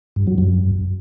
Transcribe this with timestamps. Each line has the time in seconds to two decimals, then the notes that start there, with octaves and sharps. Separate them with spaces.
0.16 G2
0.27 F#3
0.38 F#2